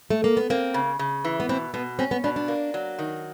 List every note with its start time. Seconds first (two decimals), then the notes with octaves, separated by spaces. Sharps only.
0.10 A3
0.24 A#3
0.37 B3
0.50 A#3 C4
0.74 C#3
0.99 C#3
1.25 E3
1.40 B3
1.49 B2 C4
1.74 B2 B3
1.99 C4 C#4
2.11 B3
2.24 B2 D4
2.36 D4
2.48 A#3
2.74 F#3
2.99 D#3